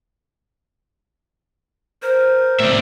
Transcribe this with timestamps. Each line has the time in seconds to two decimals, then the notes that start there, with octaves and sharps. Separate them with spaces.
2.02 A#4 C5
2.60 A2 C3 D5 E5